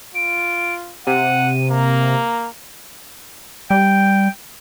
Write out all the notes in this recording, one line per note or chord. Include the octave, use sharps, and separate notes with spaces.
F4 D7
C3 F#5 D#7
A#3 A#5
G3 G5